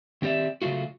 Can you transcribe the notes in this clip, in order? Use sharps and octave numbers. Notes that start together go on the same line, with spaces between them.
D#3 C4 G4 D5 E5
C#3 F#3 A3 F4 F#4